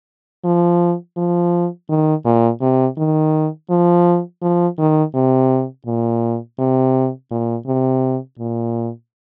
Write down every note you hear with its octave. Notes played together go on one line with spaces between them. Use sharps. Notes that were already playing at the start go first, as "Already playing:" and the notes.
F3
F3
D#3
A#2
C3
D#3
F3
F3
D#3
C3
A#2
C3
A#2
C3
A#2